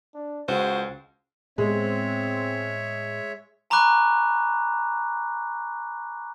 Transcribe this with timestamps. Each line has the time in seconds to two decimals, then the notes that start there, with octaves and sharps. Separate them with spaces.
0.14 D4
0.48 C#2 F#4 C5
1.58 A2 G#3 B3 C4 C#5 E5
3.70 G#5 A#5 B5 C#6 D6 F#6